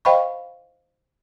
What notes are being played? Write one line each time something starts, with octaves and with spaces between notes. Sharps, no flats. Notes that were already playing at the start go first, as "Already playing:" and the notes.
C5 D#5 F5 G5 B5 C#6